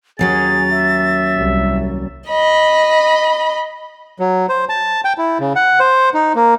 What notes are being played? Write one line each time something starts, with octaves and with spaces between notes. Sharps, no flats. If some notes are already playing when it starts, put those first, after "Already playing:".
D#2 F#3 C#4 G#4 A6
E5
C2 G3
D#5 B5
F#3
C5
A5
G5
E4
C#3
F#5
C5
D#4
A#3